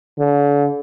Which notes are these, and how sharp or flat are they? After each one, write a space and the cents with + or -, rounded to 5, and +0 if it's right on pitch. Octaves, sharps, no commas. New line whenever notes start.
D3 -40